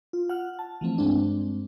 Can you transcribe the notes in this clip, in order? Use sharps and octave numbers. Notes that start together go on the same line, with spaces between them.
F4
F#5 F6
A5
E3 F3 A3 C4
G2 G#3 C4 D4